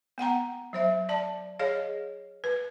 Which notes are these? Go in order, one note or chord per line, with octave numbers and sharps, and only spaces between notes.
B3 F#5 G5 A#5
F#3 C5 E5
D5 A5
G#4 C#5 D#5 F5
B4